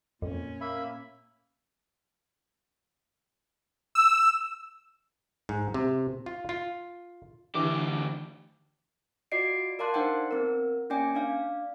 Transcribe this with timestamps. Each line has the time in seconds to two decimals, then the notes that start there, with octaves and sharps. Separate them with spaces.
0.22 F2 A#2 C#4
0.61 A#3 E5 B5
3.95 E6
5.49 G#2
5.74 C3
6.26 F4
6.49 F4
7.55 D2 E3 D4 G4 D6
9.32 F4 F#4 D5 D#5 C7 D7
9.79 A#4 D5 F5 A5 C6 F#6
9.94 D4 D#4 C5 F#5 G5
10.31 B3 C4 A#4
10.90 A#3 C#4 D5 G5 G#5
11.14 D4 D5 F5